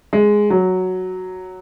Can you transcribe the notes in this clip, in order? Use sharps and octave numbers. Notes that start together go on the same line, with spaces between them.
G#3
F#3